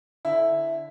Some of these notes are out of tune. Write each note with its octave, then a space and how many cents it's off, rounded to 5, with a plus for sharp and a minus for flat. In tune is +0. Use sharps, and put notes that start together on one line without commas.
D3 -10 E4 +0